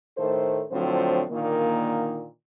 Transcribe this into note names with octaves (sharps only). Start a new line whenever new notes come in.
A2 D#3 A3 A4 C5
A2 D3 F3 F#3 C4 C5
A#2 D3 D#3 A#3